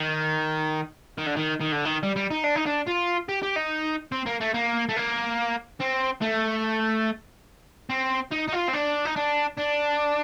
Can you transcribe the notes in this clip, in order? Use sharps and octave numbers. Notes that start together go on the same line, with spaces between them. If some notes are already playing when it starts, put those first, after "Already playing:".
Already playing: D#3
D#3
D3
D#3
D#3
D3
D#3
G3
G3
D#4
D4
D#4
D4
F4
G4
G4
D#4
C4
A#3
A3
A#3
A3
A#3
C4
A3
C4
D#4
D#4
F4
C4
D4
D#4
D4
D4